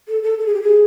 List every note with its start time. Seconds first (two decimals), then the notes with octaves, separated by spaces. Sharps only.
0.08 A4
0.23 A4
0.39 A4
0.46 G#4
0.54 G4
0.62 G#4